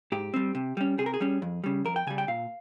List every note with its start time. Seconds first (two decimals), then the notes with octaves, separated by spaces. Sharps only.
0.12 G#2 G4
0.34 G3 C4
0.55 C3
0.77 G3 C#4
0.98 C3 G#4
1.06 A#4
1.14 G#4
1.21 G3 C#4
1.42 F2
1.64 C#3 G3
1.85 F2 A#4
1.96 G5
2.07 C#3 G3 G#5
2.18 G5
2.28 A#2 F5